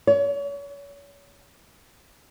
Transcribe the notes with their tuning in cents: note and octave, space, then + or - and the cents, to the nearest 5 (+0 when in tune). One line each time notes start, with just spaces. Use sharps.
C#5 +35